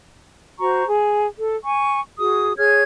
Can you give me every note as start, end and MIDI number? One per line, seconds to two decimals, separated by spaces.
0.60 0.85 66
0.60 0.85 72
0.60 0.85 82
0.60 0.85 85
0.88 1.27 68
1.39 1.55 69
1.64 1.99 80
1.64 1.99 85
2.18 2.53 66
2.18 2.53 68
2.18 2.53 87
2.58 2.83 68
2.58 2.83 73
2.58 2.83 89
2.58 2.83 92